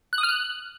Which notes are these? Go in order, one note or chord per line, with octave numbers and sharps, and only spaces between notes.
F#6
D#6
F6
F#6